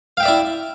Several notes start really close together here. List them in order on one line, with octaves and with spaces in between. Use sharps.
F5 G5 E5 D5 E4